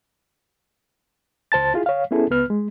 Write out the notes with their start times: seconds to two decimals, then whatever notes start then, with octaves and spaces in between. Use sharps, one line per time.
1.52 C#2 C5 A5 A6
1.74 E4 F4 G#4
1.86 C#5 F5
2.11 B3 C#4 E4 G#4 A4
2.31 C#2 B3 B4 F6
2.50 G#3